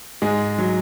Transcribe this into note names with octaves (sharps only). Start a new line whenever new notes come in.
G#2 G#3
F#3